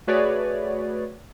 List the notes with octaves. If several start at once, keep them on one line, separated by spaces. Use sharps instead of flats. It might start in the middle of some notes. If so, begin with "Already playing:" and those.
A3 F#4 G#4 B4 C#5 D5